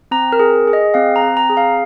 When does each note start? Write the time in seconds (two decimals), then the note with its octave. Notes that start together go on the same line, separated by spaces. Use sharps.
0.11 C4 A#5
0.32 A#4
0.39 G#4
0.67 G#4
0.73 D#5
0.94 C4 F5
1.16 A#5
1.22 C4
1.37 A#5
1.50 G#4
1.57 F5